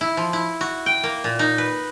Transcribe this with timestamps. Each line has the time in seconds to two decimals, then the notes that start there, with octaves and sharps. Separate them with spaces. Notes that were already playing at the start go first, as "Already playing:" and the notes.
0.01 E4
0.17 F3
0.33 E4
0.61 F#4
0.86 G5
1.04 A#3
1.24 A#2
1.39 D#4
1.58 B4